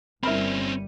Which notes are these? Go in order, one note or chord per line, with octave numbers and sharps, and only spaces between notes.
G1 G3 C4 C#4 E4 A#4 B5